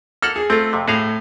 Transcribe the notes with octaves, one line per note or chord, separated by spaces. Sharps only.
A#3 A4 F#5 F6
G#4
A3 C4 F4
F2 C3
A2 F#4 G#4 F5